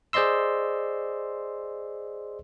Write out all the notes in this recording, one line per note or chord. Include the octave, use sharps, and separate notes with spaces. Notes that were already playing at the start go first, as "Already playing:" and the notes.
G#4 C5 D5 D#5 C6 E6